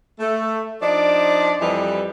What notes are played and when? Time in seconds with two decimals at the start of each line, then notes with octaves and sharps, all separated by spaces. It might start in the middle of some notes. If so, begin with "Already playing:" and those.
0.20 A3
0.81 F3 D4 D#4 D5
1.61 F2 E3 G3 G4 B4 D#5